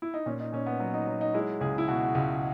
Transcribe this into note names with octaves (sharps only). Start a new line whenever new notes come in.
E4
D#4
A#2 C#4
D#4
A#2 C#4
B3
F#3 B3
D#4
F#3
D#4
G#3 E4
C#2 G#4
E4
B2 F#4
C#2